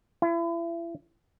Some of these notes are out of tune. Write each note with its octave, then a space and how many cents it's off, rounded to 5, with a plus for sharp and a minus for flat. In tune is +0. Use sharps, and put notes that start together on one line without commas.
E4 +35